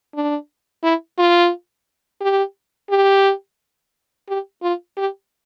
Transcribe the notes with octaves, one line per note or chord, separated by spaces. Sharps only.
D4
E4
F4
G4
G4
G4
F4
G4